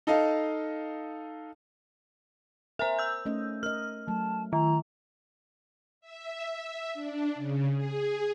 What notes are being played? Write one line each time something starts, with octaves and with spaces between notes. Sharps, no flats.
D#4 A4 D#5 F5
A#4 C5 E5 G#5 A#5
E6 G6
A3 C#4 D#5
A#4 D#5 F6
F#3 A3 A5
D#3 A#5
E5
D4
C#3
G#4